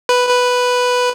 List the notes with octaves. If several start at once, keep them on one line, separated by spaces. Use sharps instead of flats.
B4
B4